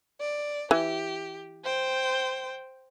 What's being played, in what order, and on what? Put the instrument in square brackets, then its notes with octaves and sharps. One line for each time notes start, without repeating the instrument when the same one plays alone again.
[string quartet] D5
[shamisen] E3 [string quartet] G4
[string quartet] C5 G5